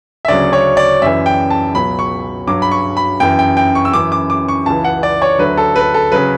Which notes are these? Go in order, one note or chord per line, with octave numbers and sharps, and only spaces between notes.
E5
D2 C#3 F#3 D5
C#5
D5
F#2 E3 E5
G5
A5
C#2 B2 F#3 B5
C#6
G2 F#3 D6
B5
C#6
B5
F#2 E3 G5
G5
G5
C#6
E6
F#2 E3 D6
D6
D6
C#6
C#2 C#3 E3 A5
F#5
D5
C#5
D2 D3 F#3 B4
A4
B4
A4
C#3 F#3 B4